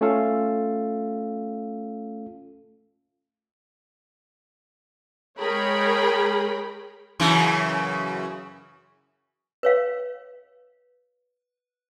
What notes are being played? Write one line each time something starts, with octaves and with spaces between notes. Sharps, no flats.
A3 C#4 F4 A4 F5
G#3 G#4 A#4 C#5 G5 B5
F#2 C#3 E3
B4 C#5 F5